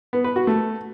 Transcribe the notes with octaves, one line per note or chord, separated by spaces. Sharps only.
B3
B4
F#4
A3